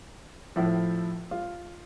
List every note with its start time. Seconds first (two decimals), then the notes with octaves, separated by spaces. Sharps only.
0.56 A2 F3 E4
1.31 F4